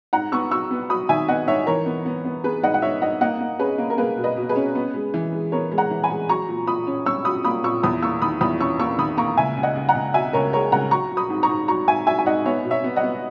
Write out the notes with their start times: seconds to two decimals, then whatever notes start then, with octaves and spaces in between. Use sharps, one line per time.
0.13 G#2 F#5 A#5
0.32 B3 C#6 E6
0.51 F#3 C#6 E6
0.71 B3
0.90 F#3 B5 D#6
1.09 D#3 E5 G#5
1.28 B3 D#5 F#5
1.47 G#2 C#5 E5
1.67 E3 A#4 C#5
1.86 B3
2.06 B3
2.25 B3
2.44 B3 G#4 B4
2.63 G#2 D#5 F#5
2.74 F#5
2.82 G#2 C#5 E5
3.02 G#2 D#5 F#5
3.21 A#3 D#5 F#5
3.40 A#3
3.59 C#4 G#4 B4
3.78 A#3
3.90 A#4
3.98 A#3 G#4 B4
4.17 B2
4.24 B4 D#5
4.37 B2
4.49 G#4 B4
4.56 C#4
4.75 B3
4.94 G#3
5.14 E3
5.33 G#3
5.52 B3 A#4 C#5
5.72 G#3
5.78 F#5 A#5
5.91 E3
6.03 G#5 B5
6.10 G#3
6.29 F#3 A#5 C#6
6.49 A#2
6.67 A#2 B5 D#6
6.87 C#4
7.06 C#4 C#6 E6
7.25 F#3 B5 D#6
7.44 A#3 B5 D#6
7.64 A#2 C#6 E6
7.83 E2 B5 D#6
8.02 A#3 C#6 E6
8.22 D#3 B5 D#6
8.41 E2 B5 D#6
8.60 C#4 C#6 E6
8.79 A#3 C#6 E6
8.98 D#3 B5 D#6
9.17 A#3 A#5 C#6
9.37 C#2 E5 G#5
9.57 C#2
9.63 D#5 F#5
9.76 C#2
9.89 F#5 A#5
9.95 C#2
10.14 B2 E5 G#5
10.33 C#2 A#4 C#5
10.53 G#3 A#4 C#5
10.72 C#2 F#5 A#5
10.91 F#3 A#5 C#6
11.11 F#3
11.17 B5 D#6
11.30 G#2
11.43 A#5 C#6
11.49 G#2
11.68 F#3 A#5 C#6
11.88 G#2 E5 G#5
12.07 F#3 E5 G#5
12.19 G#5
12.26 G#2 D#5 F#5
12.45 B3 C#5 E5
12.64 B2
12.71 C#5 E5
12.84 B3
12.96 D#5 F#5
13.03 B3